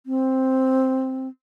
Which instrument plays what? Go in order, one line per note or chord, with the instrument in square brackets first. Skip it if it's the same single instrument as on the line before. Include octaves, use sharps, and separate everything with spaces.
[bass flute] C4